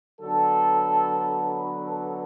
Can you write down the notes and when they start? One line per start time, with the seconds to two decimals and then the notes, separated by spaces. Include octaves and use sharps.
0.20 D3 F#3 B3 A4
1.52 B4
1.84 A4